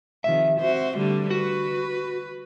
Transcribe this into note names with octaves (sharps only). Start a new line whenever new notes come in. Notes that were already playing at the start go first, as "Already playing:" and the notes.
C3 D#3 F3 E5
C4 F#4 C5
D3 G3 A3
F#4 B4